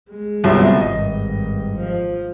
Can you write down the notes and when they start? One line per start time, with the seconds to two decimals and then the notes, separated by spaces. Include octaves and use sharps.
0.10 G#3
0.44 G1 C2 F#3
0.80 G#1 G2 D#5
1.78 F3